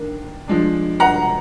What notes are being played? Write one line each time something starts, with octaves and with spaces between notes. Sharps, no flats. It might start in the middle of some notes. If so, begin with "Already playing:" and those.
Already playing: D#3 A#3 D4
F3 G#3 D4
F#5 A#5